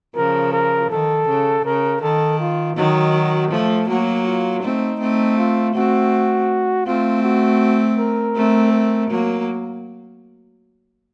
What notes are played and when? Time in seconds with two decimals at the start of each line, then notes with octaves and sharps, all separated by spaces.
0.15 C#3 F3 A#4
0.53 A#4
0.90 D#3 A4
1.28 C#3
1.65 C#3 A#4
2.02 D#3 A4
2.40 F4
2.76 D#3 F#3 D#4
3.14 F#4
3.51 F3 A3 A4
3.89 F#3 A#3 F#4
4.25 F4
4.63 A3 C4 D#4
5.00 A3 C4
5.38 F4
5.75 A3 C4 F#4
6.86 A3 C4 F4
7.23 F#4
7.98 A#4
8.35 A3 C4
8.72 A#4
9.10 F#3 A#3